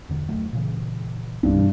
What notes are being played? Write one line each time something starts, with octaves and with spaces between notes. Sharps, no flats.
E1 D3
E1 F#3 A3
A#2 C#3 E3
C2 G2
B2 E3 G3